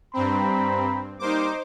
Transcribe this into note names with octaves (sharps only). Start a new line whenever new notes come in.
G2 C4 A#5 B5
G3 A#3 D#4 C5 D6